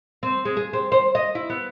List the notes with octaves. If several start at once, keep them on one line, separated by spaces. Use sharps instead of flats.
C4
G#3
G#4
C4
C5
D#5
E4
B3